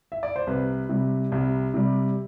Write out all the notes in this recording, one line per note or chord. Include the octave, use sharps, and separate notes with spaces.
E5
D5
C5
C2 B4
C3 G3
C2
C3 G3